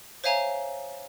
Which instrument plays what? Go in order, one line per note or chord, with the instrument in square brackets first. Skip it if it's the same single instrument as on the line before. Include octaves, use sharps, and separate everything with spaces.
[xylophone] C5 C#5 E5 F5 G#5 A#5